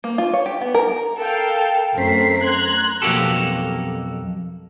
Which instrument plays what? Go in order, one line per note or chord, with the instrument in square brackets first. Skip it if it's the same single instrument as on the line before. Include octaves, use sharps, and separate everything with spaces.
[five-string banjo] A#3
F4
C#5
G4
B3
A#4
[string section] A4 A#4 F5 G5
F#2 A3 C4 A#4 B6 C7
A#5 C6 F#6 G#6
[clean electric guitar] B1 F2 A#3 F#4 G4 A4